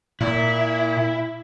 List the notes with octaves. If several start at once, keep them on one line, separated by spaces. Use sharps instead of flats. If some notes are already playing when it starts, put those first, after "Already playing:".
A#2 E4